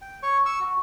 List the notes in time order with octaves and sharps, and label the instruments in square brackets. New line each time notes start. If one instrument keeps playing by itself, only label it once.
[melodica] G5
C#5 C#6
C#6 E6
F#4